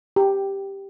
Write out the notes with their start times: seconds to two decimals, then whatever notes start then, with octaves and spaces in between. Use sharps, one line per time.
0.16 G4